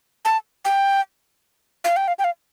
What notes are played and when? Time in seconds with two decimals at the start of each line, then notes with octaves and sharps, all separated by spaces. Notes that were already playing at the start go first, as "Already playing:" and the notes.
0.25 A5
0.65 G5
1.84 F5
1.96 G5
2.08 F5
2.19 G5
2.24 F5